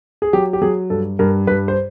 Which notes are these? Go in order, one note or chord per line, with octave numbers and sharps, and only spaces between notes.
G#4
F#3 G4
G4
F#3 G#4
G2 A4
G2 A#4
G2 B4
C5